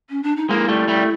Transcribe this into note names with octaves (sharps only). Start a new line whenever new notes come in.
C#4
D4
D#4
G#3 A#3 E4
G3 A3
G3 A3